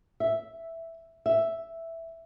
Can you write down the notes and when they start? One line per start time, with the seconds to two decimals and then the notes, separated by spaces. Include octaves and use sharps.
0.20 E5
1.26 E5